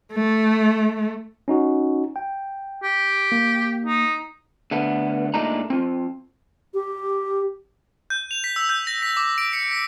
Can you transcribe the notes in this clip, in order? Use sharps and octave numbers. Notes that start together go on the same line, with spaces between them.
A3
C#4 D#4 F#4
G5
G4
A#3
D#4
D3 A3 B3
A#2 G#3 A3 D4 D#4 A#5
C4 F4
G4
G6
F7
B6
E6
G6
A#6
B6
D6
D7
C#7
B6